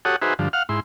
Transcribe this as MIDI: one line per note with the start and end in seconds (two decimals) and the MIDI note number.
0.05 0.16 66
0.05 0.16 67
0.05 0.16 69
0.05 0.16 73
0.05 0.16 78
0.05 0.16 87
0.22 0.34 63
0.22 0.34 66
0.22 0.34 68
0.22 0.34 71
0.22 0.34 72
0.22 0.34 76
0.39 0.48 43
0.39 0.48 50
0.39 0.48 53
0.53 0.63 77
0.53 0.63 78
0.53 0.63 89
0.69 0.80 44
0.69 0.80 64
0.69 0.80 84